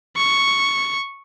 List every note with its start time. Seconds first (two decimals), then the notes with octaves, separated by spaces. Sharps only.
0.17 C#6